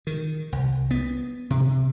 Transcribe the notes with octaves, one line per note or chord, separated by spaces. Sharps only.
D#3
C2
B3
C3